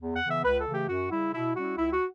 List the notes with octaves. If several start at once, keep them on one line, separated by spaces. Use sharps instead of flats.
E2
F#5
C#3 E3 B3
E5
C#2 B4
A4
C#3 E3 A3
G4
F#2 F#4
C#3 G3 E4
B2 E4
G3 C#4 E4 F#4
C#2 E4
F#4